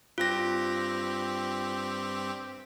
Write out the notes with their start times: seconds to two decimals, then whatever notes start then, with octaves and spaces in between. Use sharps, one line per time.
0.18 G2 C4 F4 G4 A#6